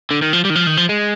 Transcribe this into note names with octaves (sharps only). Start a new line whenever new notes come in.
D3
D#3
F3
G3
D#3
F3
D#3
F3
G#3